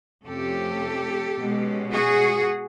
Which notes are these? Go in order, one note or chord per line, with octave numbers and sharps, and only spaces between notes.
F2 C3 F3 A3 C#4 G4 A4
B2 G#3 C#4
F#4 G#4